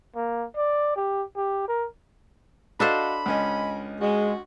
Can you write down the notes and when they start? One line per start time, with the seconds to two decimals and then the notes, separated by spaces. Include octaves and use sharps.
0.16 A#3
0.56 D5
0.96 G4
1.37 G4
1.68 A#4
2.80 D4 F#4 A4 C5 D#5 F5 B5
3.26 C#2 C#4 D#5
4.01 G#3 F#4